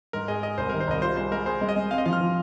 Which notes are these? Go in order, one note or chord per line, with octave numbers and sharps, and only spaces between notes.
G#2 A#4
G#4 D#5
G#4 D#5
C2 C5
D#3 A#4
C5
C2 D#5
F4 C5
G#3 C5
G#3 A#4
G#4 C5
G#3
D#5
G#3
C4 F5
D#5
F3 F5
F6
F3